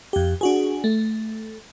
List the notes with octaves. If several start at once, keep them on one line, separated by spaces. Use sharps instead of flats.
F2 G4
D4 F#4 G#4
A3